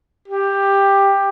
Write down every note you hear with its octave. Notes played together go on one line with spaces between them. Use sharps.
G4